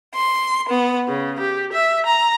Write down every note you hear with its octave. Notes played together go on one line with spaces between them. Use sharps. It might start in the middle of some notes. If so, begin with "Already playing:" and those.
C6
B3
C#3
G4
E5
A#5